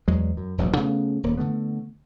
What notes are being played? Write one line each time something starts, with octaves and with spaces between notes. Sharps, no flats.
E2 F#3 G#3
F#2
E1 A#1 G#2 F#3
C#3 A3 B3
D#1 A#3
D3 F#3 A3 B3